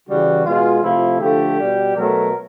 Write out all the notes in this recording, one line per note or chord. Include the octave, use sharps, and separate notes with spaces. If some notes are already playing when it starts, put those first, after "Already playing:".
C#3 E3 G3 F#4
B2 G#3 F4
C3 F3 A3 E4
D3 F3 A3 G4
B2 G3
B2 F#3 A3 A#4